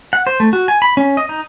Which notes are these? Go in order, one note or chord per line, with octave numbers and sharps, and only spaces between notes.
F#5
C5
A3
F#4
G#5
B5
C#4
D#5
D#4